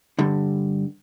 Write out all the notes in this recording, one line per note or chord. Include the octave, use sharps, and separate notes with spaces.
G2 D3